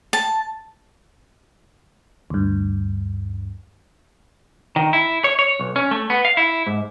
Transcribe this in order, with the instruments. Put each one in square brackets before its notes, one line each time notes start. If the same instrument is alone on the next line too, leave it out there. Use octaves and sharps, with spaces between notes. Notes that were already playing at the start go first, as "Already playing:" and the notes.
[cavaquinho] A5
[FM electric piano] D2 G2
[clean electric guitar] D#3
E4
C#5
C#5
B1
C#4
A3
B3
F5
E4
G#2